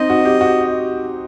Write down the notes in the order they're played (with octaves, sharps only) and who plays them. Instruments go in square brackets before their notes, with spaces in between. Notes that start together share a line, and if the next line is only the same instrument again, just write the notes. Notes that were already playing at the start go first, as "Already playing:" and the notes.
Already playing: [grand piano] C4 D#4 [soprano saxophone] D#5
[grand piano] F#4
G4
F#4